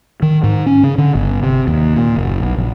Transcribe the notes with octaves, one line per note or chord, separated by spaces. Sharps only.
D#3
G#2
C#4
C#3
D3
G1
C3
D#2
A#2
F#1
B1
A#1